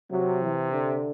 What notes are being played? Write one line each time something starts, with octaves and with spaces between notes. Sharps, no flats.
C3 F#3
E3
D3